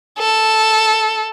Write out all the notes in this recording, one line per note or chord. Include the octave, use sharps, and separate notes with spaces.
A4